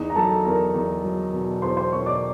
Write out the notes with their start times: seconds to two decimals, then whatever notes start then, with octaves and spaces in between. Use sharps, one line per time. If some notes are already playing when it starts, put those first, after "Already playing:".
Already playing: E2 D#4 D#5
0.10 A#5
0.16 F#3 A4 A5
0.45 E2 A#4 A#5
0.74 E2
1.04 F#3
1.33 B2
1.62 E2 C5 C6
1.77 C5 C6
1.92 B2 C#5 C#6
2.06 D5 D6